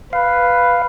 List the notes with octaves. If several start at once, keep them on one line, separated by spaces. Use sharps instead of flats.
B4 F5